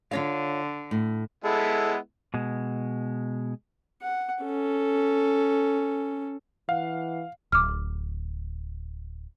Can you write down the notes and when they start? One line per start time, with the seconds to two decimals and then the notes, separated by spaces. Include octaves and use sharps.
0.11 D3 F4 C#5 F5
0.91 A2
1.44 G#3 B3 E4 A4
2.34 B2 G#3
4.01 F#5
4.43 C#4 A4
6.69 E3 F5 F#5
7.52 D1 D6 F6